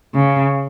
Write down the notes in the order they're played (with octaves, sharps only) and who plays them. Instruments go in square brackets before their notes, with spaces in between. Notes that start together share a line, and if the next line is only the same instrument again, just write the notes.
[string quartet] C#3